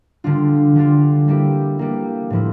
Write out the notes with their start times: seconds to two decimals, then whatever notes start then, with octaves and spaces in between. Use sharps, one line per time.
0.24 D3 G3 D4 F4
0.76 D3 G3 D4 F4
1.28 G3 A#3 E4 G4
1.79 G3 A#3 E4 G4
2.30 A2 F3 A#3 E4